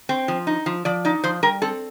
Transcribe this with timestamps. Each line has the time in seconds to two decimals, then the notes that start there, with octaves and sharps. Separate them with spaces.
0.09 C4
0.28 F3
0.47 D#4
0.66 F3
0.85 F3 D5
1.05 D#4 D5
1.24 F3 C5
1.43 G3 A#4
1.62 C4 A4